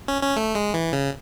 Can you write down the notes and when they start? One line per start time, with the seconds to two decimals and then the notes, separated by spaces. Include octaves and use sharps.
0.08 C#4
0.22 C#4
0.36 A3
0.55 G#3
0.74 E3
0.93 C#3